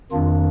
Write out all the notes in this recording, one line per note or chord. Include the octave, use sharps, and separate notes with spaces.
F2 D#3 A#3 D4 F4